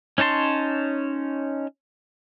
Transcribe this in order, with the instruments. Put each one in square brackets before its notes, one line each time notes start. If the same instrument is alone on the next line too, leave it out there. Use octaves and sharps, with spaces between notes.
[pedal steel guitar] C#4 D#4 C#5 A5 C6